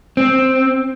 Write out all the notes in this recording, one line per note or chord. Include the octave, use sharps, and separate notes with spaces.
C4